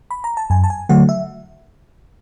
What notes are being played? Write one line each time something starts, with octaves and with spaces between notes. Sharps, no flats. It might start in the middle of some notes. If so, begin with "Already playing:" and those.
B5
A#5
A5
F#2 G#5
A5
G#5
D3 F#3 A3 F#5
E5